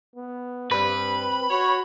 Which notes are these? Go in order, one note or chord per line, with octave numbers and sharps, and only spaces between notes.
B3
G2 C4 B4 B5
F#4 C#5